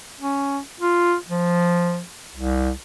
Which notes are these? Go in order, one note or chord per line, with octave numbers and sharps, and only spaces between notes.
C#4
F4
F3
C2